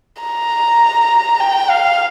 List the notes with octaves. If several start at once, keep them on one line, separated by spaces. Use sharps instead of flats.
A#5
G5
F5